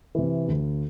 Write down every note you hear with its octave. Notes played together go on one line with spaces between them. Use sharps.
C3 E3
D2